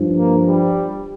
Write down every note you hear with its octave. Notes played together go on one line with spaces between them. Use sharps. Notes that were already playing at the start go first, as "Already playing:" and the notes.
Already playing: G2 F3
A#3
G3